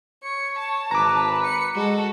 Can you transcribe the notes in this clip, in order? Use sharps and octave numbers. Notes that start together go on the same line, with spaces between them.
C#5 C#7
A5
G#1 B4 A#5 D6
C#7
G#3 F#4 A4